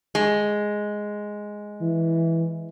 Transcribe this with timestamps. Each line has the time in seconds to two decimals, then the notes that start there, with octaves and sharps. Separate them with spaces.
0.15 G#3
1.81 E3